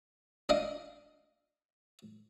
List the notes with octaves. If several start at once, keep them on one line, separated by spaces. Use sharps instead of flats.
D4 D#5 F5